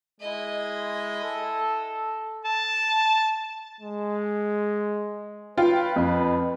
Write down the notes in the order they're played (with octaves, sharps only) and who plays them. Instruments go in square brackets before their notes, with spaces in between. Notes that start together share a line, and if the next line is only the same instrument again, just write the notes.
[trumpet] G#3 [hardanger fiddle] E4 D#5
[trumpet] A4
[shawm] A5
[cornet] G#3
[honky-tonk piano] F4 G5 [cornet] B4
[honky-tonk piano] F2